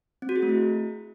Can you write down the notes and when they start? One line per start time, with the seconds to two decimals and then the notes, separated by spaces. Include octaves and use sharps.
0.22 C4
0.29 F#4
0.36 G#4
0.42 A3
0.49 E4